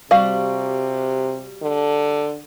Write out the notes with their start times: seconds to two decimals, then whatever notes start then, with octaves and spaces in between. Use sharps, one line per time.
0.11 C3 G3 F#4 F5
1.62 D3